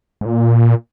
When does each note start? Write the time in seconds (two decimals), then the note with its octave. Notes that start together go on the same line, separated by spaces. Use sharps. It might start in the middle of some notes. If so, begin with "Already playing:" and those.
0.21 G#2
0.26 A#2